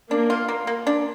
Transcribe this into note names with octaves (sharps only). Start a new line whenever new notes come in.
A#3 D4
F4
A#3
A#3
D4